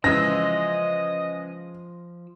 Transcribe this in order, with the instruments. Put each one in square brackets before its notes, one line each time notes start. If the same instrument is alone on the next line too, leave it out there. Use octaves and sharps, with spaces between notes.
[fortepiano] C#3 E3 G#3 [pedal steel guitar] F3 E6 [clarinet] D#5 [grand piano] A#6